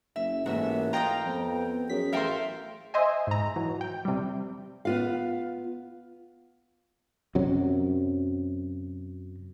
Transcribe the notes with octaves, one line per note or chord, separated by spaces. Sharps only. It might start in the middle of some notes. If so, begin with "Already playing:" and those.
F#1 E5
A1 G#2 A#3 F#4 E5
F4 D#5 F5 G5 A#5
F2 B3
F#2 G#4 B6
A1 A4 A#4 E5 F5 G5 C6
C5 D#5 E5 G#5
G#2 A#5
E3 F#3
G5
C3 G3
B3 F4 F5
F#2 C3 F#3